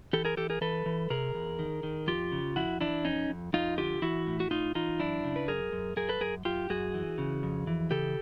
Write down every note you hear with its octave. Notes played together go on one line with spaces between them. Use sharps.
E3 G4 A4
G#4 A#4
E3 G4 A4
G#4 A#4
E3 A4 B4
E3
C3 G#4 A#4
E2
D#3
D#3
F2 F4 G4
C#3
F2 E4 F#4
E3 D4 E4
F2 C#4 D#4
F2
F2 D#4 F4
D3 F4 G4
E3 E4 F#4
A2
F#4
A2 D#4 F4
E3 D#4 F4
F#2 D4 E4
C#3
B4
F#2 G#4 A#4
F#2
F#2 G#4 A#4
A4 B4
F#2 G#4 A#4
F#2 F4 G4
F#2 F#4 G#4
E3
C#3
F2
E3
C#3 G4 A4